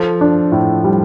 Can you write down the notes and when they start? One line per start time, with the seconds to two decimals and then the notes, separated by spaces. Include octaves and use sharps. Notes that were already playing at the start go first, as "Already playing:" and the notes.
Already playing: F3 A4
0.21 D4
0.52 A2
0.84 G3